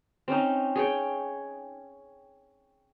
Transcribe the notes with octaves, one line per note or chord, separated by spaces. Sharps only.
C4 C#4 D#4
G#4 C#5 G5